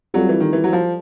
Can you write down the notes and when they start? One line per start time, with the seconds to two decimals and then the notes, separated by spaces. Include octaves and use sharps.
0.14 F#3 G3 C4 F4 A4
0.29 E3
0.40 D#3
0.53 E3
0.64 F#3
0.73 F3